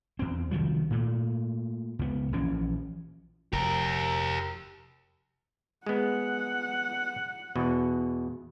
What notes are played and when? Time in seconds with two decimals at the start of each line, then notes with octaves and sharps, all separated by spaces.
0.19 E2 C4
0.51 C2 D#3 F3 F#3
0.91 A#2 A3
1.99 C#2 B3
2.33 A#1 A#2 E3 C#4
3.53 F1 G4 A#4
5.86 G#3 B3 F#5
7.56 E2 B2